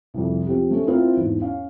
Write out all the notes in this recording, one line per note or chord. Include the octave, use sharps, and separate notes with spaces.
C2 F2
F3 C4 G4
A3 C#4
C4 E4 F4 A#4 C5
E2 G#2
C#4 F5